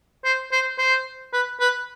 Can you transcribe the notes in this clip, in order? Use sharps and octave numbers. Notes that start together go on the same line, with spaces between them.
C5
C5
C5
B4
B4